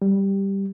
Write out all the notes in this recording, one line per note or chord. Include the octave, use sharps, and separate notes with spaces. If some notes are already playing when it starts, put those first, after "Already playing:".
G3